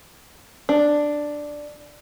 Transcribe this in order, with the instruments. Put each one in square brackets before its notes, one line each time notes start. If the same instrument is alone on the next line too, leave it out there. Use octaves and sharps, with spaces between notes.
[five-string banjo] D4